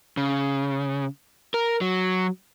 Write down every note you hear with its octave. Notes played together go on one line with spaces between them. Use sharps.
C#3
A#4
F#3